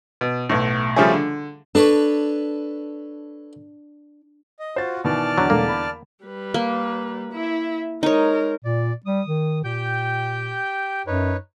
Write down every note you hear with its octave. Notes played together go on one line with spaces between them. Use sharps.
B2
B1 A2
C#3 F3 G3 A3 C#4 G#4
D3
D4 A4 B4 C#5
D#5
F4 F#4 C5 A6
B2 D#3 E3 D5 A5 F6
E2 D3 F#3
E1 B1 A3 A#3
B5
G3 B4
A#3
E4 E5
G#3 D#4 A#4 C#5
A#2 D5
G3 D#6
D#3
A#2 G4 G5 G6
F#2 D#4 B4 C#5